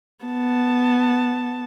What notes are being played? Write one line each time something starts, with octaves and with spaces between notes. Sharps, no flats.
B3 A5